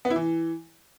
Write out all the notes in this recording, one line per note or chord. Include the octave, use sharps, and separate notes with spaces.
B3
E4
E3